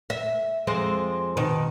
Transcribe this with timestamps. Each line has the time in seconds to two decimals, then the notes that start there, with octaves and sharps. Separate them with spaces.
0.10 E5
0.67 F2 G#3 C4
1.37 B2 D#3